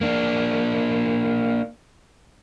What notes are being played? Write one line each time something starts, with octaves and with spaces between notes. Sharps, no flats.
A#3 D4